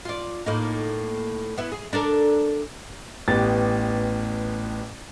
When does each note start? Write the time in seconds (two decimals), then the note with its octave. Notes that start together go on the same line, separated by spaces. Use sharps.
0.05 F4 D5
0.46 A2 A#3 D#4
1.58 B3 E4
1.72 G#4
1.93 D4 A4 A#4
3.28 A1 B3 G4 A6